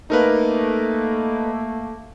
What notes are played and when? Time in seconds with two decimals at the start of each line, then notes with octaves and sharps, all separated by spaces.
0.10 A3 A#3 D#4 A#4 B4